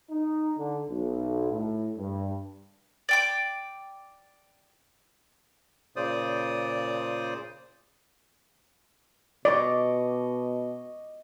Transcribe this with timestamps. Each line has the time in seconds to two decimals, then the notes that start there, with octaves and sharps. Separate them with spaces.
0.10 D#4
0.56 D3
0.90 B1
1.51 A2
1.97 G2
3.09 D5 G5 D6
5.96 A#2 C#3 C5 D5 D#6
9.45 B2 D5 D#5 C#6 D6